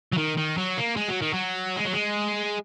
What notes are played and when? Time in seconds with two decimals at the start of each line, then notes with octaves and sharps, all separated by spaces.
0.12 F#3
0.17 D#3
0.37 D#3
0.57 F#3
0.77 A#3
0.96 G#3
1.09 F#3
1.22 D#3
1.33 F#3
1.76 G#3
1.85 F#3
1.93 G#3